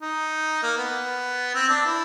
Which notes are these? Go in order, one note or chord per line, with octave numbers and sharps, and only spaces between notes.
D#4
A#3
B3
C4
D4
E4